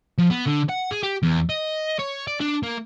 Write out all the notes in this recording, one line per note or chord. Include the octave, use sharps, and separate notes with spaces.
F3
B3
D3
F#5
G#4
G4
E2
D#5
C#5
D5
D4
A#3